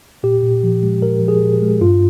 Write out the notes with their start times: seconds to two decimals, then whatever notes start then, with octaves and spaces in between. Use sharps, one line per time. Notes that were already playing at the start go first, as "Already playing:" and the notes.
0.23 A#2 G4
0.43 A#2
0.63 F3
0.83 G#3
1.02 F3 A#4
1.22 F3
1.28 G#4
1.42 A#2
1.62 G#3
1.81 G2 F4